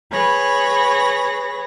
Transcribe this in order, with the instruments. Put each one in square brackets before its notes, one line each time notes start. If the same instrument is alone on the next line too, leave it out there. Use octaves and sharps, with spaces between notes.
[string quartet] G#4 B4 C#5 B5 A#6